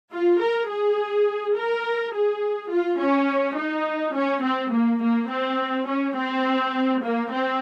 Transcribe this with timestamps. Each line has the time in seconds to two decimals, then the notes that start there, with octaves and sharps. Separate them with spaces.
0.12 F4
0.41 A#4
0.68 G#4
1.55 A#4
2.13 G#4
2.70 F4
2.99 C#4
3.56 D#4
4.14 C#4
4.42 C4
4.72 A#3
5.01 A#3
5.29 C4
5.87 C#4
6.16 C4
7.02 A#3
7.31 C4